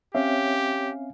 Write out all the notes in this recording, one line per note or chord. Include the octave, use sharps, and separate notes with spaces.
C4 C#4 G4 C#5 E5 F5